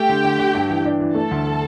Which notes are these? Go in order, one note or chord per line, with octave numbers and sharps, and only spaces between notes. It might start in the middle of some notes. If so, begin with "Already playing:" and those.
Already playing: A3 G4 G5
D3
D3
D3
G2
E3
D4
E3
A3 A4 A5
D2